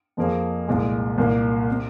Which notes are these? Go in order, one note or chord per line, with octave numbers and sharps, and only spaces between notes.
F2 F3 A#3 G#4
C2 A#2 G#3
C2 A#2 A#3
C3